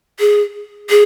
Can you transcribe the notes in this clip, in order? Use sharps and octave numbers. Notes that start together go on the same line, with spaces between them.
G#4
G#4